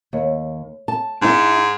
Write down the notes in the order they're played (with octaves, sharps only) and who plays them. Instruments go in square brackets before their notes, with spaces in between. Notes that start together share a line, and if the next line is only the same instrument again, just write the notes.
[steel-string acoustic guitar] D#2
A5
[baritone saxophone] G#2 [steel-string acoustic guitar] D4 E4